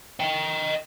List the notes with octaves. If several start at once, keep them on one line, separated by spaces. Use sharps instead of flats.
D#5 G5